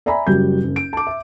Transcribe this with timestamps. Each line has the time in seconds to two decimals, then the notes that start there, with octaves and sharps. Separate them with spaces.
0.06 D5 E5 G#5 A#5 B5
0.27 F#1 F#3 G3 G6
0.63 F#1
0.76 D7
0.93 A5 D6
1.07 E5